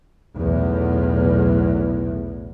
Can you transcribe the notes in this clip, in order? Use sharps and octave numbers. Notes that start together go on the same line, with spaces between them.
B1 E2 A2